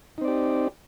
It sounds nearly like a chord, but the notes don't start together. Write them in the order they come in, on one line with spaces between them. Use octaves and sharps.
D#4 C4 D5 G4